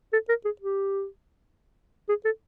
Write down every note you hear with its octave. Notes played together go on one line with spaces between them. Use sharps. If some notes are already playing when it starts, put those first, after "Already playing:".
A4
A#4
G#4
G4
G#4
A4